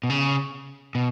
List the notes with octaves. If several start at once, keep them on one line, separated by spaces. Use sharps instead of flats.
B2
C#3
B2